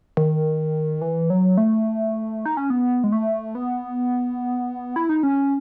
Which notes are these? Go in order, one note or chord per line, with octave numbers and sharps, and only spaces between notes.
D#3
E3
F#3
A3
D#4
C#4
B3
G#3
A3
B3
E4
D#4
C#4